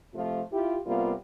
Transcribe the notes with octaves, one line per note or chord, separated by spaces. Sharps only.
C3 F3 A3 F4
E4 F4 G4
C3 G3 A#3 B3 F4